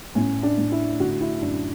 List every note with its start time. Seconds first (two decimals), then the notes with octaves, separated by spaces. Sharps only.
0.15 A2 C#4
0.43 D4
0.58 A2
0.72 E4
1.00 D3 F#4
1.21 E4
1.42 F#2 D4